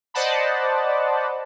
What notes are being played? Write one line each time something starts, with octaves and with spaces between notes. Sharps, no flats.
C5 D5 D#5 F#5 A5 B5